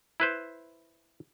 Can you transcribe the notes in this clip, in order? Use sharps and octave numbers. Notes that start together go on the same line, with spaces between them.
E4 B4 C5